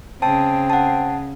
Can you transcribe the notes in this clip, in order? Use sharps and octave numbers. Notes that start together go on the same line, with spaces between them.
C#3 C4 A5
F#5 A5